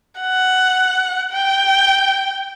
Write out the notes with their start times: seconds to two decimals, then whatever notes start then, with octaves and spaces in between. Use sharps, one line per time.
0.20 F#5
1.33 G5